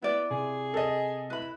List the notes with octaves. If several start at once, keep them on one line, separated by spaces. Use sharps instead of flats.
B3 E4 D5
C3 G#4
A4 D#5
E4 B4 B5